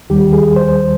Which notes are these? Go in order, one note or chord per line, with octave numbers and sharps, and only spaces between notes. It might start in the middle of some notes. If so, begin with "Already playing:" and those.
D#2 D#3 G3 G4
G#4
C5